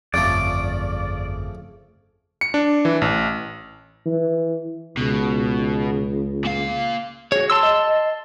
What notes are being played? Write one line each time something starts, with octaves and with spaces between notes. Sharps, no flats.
G1 F2 C#3 F3 A3 D5
C#7
D4
E3
A1
E3
C#2 B2
A#2 F5
F#4 G#4 C#5
A5 C6 E6
D#5